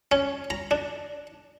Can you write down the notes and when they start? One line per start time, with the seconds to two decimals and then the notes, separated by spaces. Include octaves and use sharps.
0.12 C#4
0.50 A#5
0.71 D4